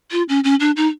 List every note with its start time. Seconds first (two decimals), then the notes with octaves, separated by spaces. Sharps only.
0.12 F4
0.29 C#4
0.44 C#4
0.60 D4
0.76 D#4